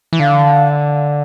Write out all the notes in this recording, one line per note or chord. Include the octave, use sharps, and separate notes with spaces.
E3
D3 F5